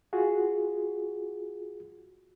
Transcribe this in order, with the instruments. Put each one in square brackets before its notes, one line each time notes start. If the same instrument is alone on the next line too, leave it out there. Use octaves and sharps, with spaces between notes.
[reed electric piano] F4 F#4 G#4